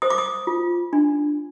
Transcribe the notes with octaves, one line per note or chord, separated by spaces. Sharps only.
C5 D#6
D6
D#6
F4
D4